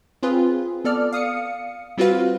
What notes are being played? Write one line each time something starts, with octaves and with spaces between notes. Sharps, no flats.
C4 F4 G#4 B4
B3 A4 D5 F6
F5 D#6 C#7
G3 C4 F4 F#4 B4 F5